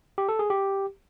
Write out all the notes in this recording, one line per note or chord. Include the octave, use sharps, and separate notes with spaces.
G4
A4
G#4
G4